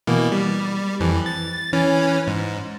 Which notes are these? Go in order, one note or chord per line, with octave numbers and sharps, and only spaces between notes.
B2 E3 A#3
G3
F2 E3
A6
E3 C#4
G#2